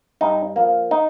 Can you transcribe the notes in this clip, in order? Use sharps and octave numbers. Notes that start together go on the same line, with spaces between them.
G2 D#4
F3 A#3
D#4